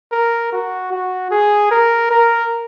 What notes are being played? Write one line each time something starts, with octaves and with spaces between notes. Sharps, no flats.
A#4
F#4
F#4
G#4
A#4
A#4